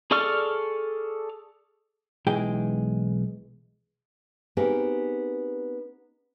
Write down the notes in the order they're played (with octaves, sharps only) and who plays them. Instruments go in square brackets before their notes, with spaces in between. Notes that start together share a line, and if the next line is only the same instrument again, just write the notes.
[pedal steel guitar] G#4 A4 D5 C#6 F6
[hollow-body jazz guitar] B1 E3 G#3 G#4 G5
[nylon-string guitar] B3 C4 D#4 G4 G#4 A#4